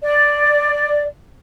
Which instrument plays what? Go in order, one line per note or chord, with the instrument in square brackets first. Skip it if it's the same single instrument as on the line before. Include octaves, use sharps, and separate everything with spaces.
[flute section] D5